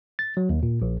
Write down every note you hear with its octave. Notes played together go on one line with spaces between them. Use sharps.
A6
F#3
D#2
A#2
A#1